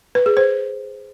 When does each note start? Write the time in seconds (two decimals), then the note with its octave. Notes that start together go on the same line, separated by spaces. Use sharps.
0.15 B4
0.26 G#4
0.37 C5